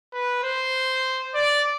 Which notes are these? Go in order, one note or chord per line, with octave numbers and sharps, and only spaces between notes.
B4
C5
D5